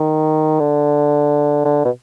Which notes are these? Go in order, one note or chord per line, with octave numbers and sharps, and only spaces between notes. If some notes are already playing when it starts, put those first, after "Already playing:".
Already playing: D#3
D3
D3
B2